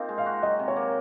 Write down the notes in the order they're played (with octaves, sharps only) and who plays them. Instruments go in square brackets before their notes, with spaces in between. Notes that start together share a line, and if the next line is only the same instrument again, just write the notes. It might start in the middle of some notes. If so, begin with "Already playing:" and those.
Already playing: [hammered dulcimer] A#3 C4 D#4 F4
G#3
[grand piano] F5
[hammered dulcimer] F#4
[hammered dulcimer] F#3 [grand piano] D#5
[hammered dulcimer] C3
[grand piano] C#5
[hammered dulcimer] A#3